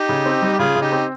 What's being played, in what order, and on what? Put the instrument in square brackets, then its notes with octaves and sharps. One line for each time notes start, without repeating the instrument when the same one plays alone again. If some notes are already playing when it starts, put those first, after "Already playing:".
Already playing: [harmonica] D#4 G4
[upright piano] C#3
C4
G3
[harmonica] G4
[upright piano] C#3 [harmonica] F4 G#4
[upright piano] C#3
[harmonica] D#4 G4
[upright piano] C4